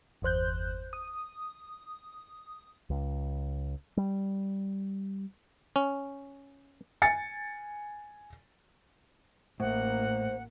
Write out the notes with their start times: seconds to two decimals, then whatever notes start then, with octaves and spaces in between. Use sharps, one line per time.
0.22 G1 E2 C5 F#6 G6
0.93 D#6
2.90 C#2
3.97 G3
5.76 C#4
7.02 G#5 A6 C#7
9.60 A1 A2 A#3 C5 F#5